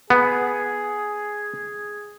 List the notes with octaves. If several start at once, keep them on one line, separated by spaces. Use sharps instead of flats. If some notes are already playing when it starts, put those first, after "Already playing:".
B3 G#4